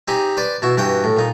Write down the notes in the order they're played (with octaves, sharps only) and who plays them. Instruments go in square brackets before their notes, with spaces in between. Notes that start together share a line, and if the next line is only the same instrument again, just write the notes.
[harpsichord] C4 D#4 G4 G#4
B4 C5 D5
B2 E4 F#4
G2 E3 F#4 F#5 G5
A2
A#2 D#4